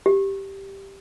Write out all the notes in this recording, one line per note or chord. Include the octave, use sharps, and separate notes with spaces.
G4